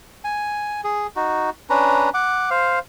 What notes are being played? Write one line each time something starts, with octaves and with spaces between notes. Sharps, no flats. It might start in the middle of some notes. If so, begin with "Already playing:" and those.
G#5
G#4
D#4 F#4
C#4 D4 B4 A#5
F#5 D6
C5 F5